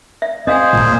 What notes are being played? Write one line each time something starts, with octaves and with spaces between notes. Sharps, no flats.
E5
C4 G#4 C5 D#5 F5 G#5
D1 G1 A#2 G#3